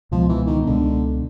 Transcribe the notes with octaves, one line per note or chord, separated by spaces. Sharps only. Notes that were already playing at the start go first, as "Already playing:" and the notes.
C#2 B2 F3 G#3 B3
E3
D#3
C#2 B2 D3 G#3 B3